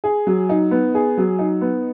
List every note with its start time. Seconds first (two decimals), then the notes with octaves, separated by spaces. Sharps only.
0.04 G#4
0.27 F#3
0.49 D#4
0.71 B3
0.95 G#4
1.18 F#3
1.39 D#4
1.61 B3